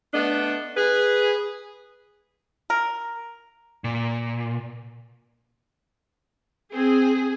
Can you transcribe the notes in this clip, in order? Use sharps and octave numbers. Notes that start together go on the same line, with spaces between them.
A3 B3 D4 D#5
G#4 B4
A#4
A#2
C4 G#4